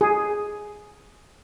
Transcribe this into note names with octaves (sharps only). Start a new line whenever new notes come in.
G#4